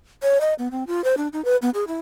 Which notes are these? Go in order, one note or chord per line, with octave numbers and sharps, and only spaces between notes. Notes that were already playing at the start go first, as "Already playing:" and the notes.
C#5
D#5
B3
C4
F4
C5
D4
D#4
B4
B3
G#4
E4